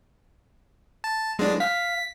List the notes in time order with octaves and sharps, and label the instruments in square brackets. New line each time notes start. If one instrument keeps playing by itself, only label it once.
[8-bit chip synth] A5
[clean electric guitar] B1 F#2 A2 [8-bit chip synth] G#3 D4
[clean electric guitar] F5 [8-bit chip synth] B6